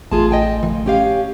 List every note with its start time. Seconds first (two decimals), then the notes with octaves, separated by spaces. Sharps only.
0.12 A1 A3 F4 G#4 A5 C6
0.31 D#5 G5 G#5
0.63 E3 F3
0.86 C#4 G4 F5